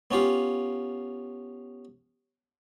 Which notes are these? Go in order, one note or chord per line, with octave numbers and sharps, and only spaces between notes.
B3 C#4 F4 G4 F5